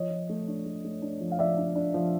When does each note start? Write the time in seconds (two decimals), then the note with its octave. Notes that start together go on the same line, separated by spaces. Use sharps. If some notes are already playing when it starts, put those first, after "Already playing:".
Already playing: F3 C#5 D#5
0.10 F3
0.29 A3
0.48 D4
0.66 A3
0.85 A3
1.02 D4
1.21 F3
1.32 F5
1.39 F3 D5 E5
1.57 D4
1.76 D4
1.94 F3